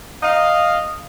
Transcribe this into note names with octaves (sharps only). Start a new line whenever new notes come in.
D#5 F5